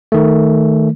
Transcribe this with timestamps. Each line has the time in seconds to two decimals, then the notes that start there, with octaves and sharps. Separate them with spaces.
0.12 D#3 A3